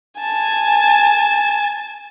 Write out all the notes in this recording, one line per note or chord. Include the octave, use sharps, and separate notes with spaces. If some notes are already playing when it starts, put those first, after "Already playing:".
G#5 A5